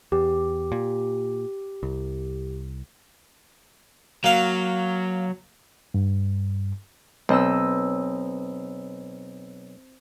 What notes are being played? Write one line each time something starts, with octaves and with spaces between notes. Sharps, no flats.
E2 G4
A#2
C2
F#3 A#3 F5
G2
B1 C4 D#5 E6